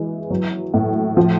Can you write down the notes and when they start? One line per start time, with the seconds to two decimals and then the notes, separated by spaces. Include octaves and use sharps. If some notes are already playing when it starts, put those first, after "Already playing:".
Already playing: E3 G#3
0.30 F#3
0.74 A2
1.17 F3